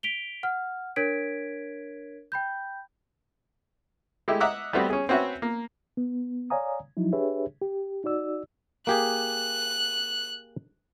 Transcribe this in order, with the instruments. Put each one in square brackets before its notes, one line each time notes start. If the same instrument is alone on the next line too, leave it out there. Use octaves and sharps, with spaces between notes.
[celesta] B6 D7 F7 G7
F#5 F6
D4 A#4 C#5 G#6 B6 D7
G5 B5 G6
[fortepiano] G#3 A3 E4 G4
D#5 E5 F#5 A#5 D6 E6
G3 A3 B3 C4 F#4 G4
C#4 G#4
C4 C#4 F#4 B4 E5
A#3
[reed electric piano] B3
C#5 D5 F5 G#5 A#5 D#6
F3 F#3 D#4 E4
D4 G4 G#4 B4 C#5 E5
G4
D#4 F#4 D5 E6
[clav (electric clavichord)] A#3 G4 G#4 [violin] F#6